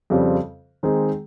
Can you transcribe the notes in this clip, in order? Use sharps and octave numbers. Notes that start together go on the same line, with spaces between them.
F2 C#3 G3 C4 F4
D#3 G#3 C4 D#4 G#4